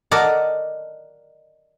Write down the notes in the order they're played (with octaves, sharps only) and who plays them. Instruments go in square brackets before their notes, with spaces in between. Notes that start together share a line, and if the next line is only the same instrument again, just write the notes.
[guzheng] A#4 D5 D#5 F#5 A5